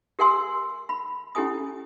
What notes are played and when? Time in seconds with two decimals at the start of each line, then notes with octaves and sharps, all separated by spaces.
0.19 G4 A#4 F#5 G#5 C6 E6
0.89 B5
1.35 C#4 E4 G4 A4 G#5 D#6